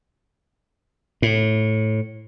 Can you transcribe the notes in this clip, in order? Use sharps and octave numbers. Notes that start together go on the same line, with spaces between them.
A2